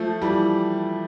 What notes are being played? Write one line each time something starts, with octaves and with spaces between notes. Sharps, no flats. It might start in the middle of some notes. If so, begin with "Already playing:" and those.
Already playing: F3 A3
E3 G3